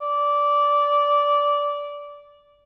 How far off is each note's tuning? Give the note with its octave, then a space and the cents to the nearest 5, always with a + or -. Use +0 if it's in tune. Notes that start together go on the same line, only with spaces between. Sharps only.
D5 -15